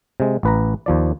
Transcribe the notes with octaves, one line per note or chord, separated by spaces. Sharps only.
C3 G#3
A1 B4 A#5
D#2 F3 D5